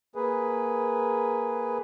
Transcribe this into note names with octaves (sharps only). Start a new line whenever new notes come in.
A#3 G#4 B4